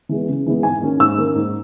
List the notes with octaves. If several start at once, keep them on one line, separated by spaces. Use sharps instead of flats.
E3 G#3 B3
C#3
E3 G#3 B3
G#2 G#5
D#3 A#3 C#4
G#2 E6
D#3 A#3 C#4
G#2